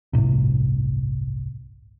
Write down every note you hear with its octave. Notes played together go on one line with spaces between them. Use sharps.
G1 C2 A2 C3